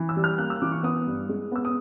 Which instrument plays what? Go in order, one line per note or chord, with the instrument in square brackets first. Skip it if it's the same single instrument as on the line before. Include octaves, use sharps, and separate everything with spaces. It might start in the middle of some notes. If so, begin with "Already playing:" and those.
Already playing: [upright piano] E3
E6
G3
F6
A#3 F#6
E6
E3 D6
C#6
B3 D#6
G2
G#3
B3 E6
D#6